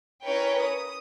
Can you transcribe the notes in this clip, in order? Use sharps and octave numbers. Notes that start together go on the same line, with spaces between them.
C#4 E4 A#4 B4 C#5 G5
D#6